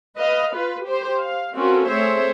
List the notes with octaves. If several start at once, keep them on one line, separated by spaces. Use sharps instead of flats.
B4 D#5 F5
F4 B4
G4 C5
F5
C4 C#4 F4 F#4 A4 A#4
A3 C4 G#4 C5 C#5 E5